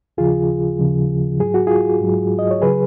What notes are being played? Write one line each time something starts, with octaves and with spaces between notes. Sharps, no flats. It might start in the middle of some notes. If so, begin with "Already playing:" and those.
D#2 C#3 F3 F4 G#4
D#2 C#3 F3
G#2 F#3 G#4
F#4
F4 G#4
G#2 F#3
D#5
C#5
C#3 F#3 G#4 B4